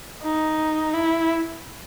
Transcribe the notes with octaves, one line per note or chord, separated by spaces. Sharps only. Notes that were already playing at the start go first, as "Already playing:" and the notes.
D#4
E4